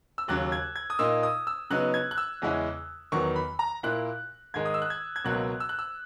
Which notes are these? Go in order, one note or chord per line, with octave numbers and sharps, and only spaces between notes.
E6
D#2 C#3 F#3 F#6
G#6
G#6
D#6
A#2 A#3 D#4 E6
D#6
E6
C#3 F#3 B3 D#4 F#6
G#6
F#6
E6
E2 C#3 G#3 C#4 E4
E2 D#3 F#3 B3 C#6
B5
A#5
A#2 A#3 E4 F#6
G#2 D#3 G#3 G#6
D#6
E6
F#6
G#6
G#6
C#2 B2 F#3 A#3 F#6
E6
F#6
E6